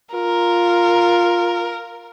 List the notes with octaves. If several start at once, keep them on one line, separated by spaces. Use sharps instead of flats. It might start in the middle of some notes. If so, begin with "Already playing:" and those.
F4 A#4